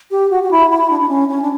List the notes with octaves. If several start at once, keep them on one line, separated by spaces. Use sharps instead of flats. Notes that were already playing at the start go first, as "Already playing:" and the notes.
G4
F#4
F#4
E4
E4
D4
D4
C#4
C#4
D4